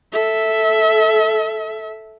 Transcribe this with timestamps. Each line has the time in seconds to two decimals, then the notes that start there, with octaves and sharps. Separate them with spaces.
0.12 A4 E5